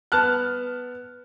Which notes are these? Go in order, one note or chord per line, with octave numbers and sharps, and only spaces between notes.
B3 A5 F6 F#6